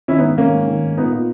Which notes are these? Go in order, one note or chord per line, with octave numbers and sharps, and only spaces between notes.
D#3 C#4 E4
G#2 B3 D#4
D#3 A#3 C#4
G#2
D#3
G#2
A#2 B3 D#4
A#2